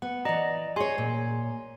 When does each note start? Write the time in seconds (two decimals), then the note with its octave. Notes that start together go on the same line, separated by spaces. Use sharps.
0.02 B3 F#5
0.25 E3 D5 D#5 A#5
0.76 G#4 C#5 G#5 C6
0.98 A#2